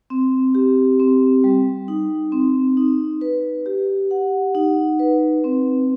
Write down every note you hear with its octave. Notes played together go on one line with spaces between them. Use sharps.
C4
G4
C4
G3
D#4
C4
D#4
B4
G4
F#5
D#4
B4
C4